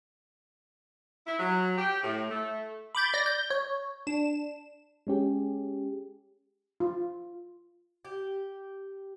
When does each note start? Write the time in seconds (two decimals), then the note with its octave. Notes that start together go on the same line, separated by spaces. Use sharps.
1.26 E4
1.40 F#3
1.77 G4
2.04 A2
2.30 A3
2.95 B5 D6 G6 A6
3.14 D5 A#6
3.26 G6
3.50 C#5
4.07 D4 E7
5.07 G#3 C#4 G4 G#4
6.80 F4
8.05 G4